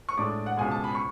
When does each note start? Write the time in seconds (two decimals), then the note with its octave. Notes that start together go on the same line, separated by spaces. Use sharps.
0.09 C#6
0.17 A2 G#3 D4 D6
0.46 F#5
0.57 C#2 B2 G#3 G#5
0.71 A5
0.84 B5
0.95 C#6